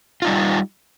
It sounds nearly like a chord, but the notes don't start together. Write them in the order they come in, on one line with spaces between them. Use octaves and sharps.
F4 D#4 G3